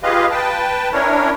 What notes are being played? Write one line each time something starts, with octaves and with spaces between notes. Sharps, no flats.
F4 G4 G#4 B4 D#5 F5
B4 G5 A5
C#4 D4 E4 A#4 C#5